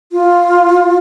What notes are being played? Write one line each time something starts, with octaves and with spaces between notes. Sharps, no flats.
F4